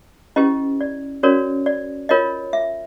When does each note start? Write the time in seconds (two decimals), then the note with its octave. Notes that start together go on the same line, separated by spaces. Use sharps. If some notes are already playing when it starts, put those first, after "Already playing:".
0.36 C#4 E4 G4 B4 D#5
0.81 D5
1.23 C#4 F#4 A#4 C#5 D5
1.66 D5
2.09 F4 A#4 C#5 D#5
2.53 E5